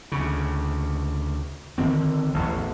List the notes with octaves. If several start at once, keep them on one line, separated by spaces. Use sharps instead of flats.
D2 C#3
D3 D#3 F3 C4
A1 E2